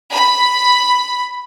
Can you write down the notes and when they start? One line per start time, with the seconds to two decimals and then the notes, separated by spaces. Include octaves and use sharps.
0.12 B5